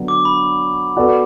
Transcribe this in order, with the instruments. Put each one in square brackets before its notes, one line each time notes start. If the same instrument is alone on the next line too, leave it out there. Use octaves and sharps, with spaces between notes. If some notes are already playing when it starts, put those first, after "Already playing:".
Already playing: [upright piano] D3 F#3 B3 D4
[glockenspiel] D6
B5
[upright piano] B3 F#4 A4 D5